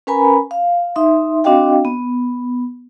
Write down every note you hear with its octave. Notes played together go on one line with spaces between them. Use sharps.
C#4 A#4 B4 G#5 A#5 B5
F5
D#4 E5 C6
C4 D4 F#4 D#5 F5 G5
B3